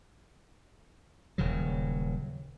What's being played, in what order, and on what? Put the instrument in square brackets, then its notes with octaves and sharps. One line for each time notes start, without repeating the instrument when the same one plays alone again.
[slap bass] D#1 C#3 F#3